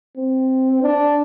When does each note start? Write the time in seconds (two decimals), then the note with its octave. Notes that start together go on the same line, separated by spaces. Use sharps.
0.17 C4
0.83 D4